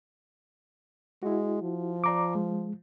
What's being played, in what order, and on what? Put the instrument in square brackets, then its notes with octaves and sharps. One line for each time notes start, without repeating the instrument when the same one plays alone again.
[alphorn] G#3 [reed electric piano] E4 F#4
[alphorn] F3
[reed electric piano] D5 A#5 D6
G#3